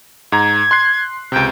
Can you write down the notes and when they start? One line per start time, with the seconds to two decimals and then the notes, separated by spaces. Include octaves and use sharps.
0.32 G#2 A#5 G#6
0.71 C6 F#6 C7
1.32 C#2 C3 G5